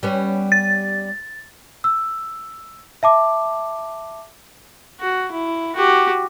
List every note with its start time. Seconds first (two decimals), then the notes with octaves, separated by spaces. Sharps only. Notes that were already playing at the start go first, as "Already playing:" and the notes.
0.03 G3 B3 C#4
0.52 A6
1.84 E6
3.03 E5 A5 D6
5.00 F#4
5.32 E4
5.76 F#4 G4